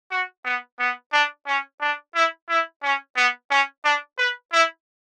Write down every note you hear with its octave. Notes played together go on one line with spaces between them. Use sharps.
F#4
B3
B3
D4
C#4
D4
E4
E4
C#4
B3
C#4
D4
B4
E4